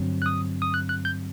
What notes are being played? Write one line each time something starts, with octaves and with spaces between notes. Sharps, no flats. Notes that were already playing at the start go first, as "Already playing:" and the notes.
Already playing: G2 D3 F#3 C4
F#6
D#6
D#6
F#6
F#6
G6